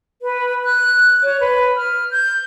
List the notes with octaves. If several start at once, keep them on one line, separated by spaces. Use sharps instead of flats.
B4
F#6
C#5
B4
F6
G6